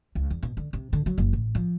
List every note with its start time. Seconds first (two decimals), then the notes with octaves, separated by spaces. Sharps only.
0.15 C#2
0.30 E2
0.43 B2
0.57 D3
0.73 C3
0.93 D3
1.06 F#3
1.18 F#1
1.33 A1
1.55 F3